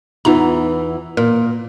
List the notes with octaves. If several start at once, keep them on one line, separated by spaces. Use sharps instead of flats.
E2 E3 B3 D#4 F4 A#5
A#2 A#4